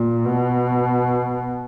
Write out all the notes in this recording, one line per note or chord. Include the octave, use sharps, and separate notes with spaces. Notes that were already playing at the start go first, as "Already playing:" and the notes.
Already playing: A#2
B2